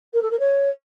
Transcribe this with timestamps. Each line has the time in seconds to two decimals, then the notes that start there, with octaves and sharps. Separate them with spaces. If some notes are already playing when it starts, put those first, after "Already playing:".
0.13 A#4
0.22 A4
0.31 A#4
0.39 C#5